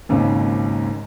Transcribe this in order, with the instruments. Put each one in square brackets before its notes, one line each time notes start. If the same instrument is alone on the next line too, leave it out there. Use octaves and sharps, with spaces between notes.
[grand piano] G#1 D#2 G#2 C#3